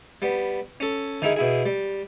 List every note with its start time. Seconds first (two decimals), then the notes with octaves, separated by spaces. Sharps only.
0.22 G3 B3
0.80 C#4 A4
1.22 D#3 D#4 E4 G#4
1.36 B2 E4 G#4
1.66 G3